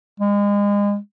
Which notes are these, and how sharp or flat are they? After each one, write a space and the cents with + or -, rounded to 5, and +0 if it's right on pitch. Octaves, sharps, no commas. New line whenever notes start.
G#3 -35